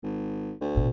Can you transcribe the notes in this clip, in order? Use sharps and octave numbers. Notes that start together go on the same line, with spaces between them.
G#1
D2
A1 B2